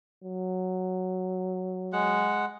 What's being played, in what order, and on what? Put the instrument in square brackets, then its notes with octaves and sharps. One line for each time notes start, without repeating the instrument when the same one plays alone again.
[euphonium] F#3
[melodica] G#3 F#5